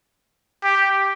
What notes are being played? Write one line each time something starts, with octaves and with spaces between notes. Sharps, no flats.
G4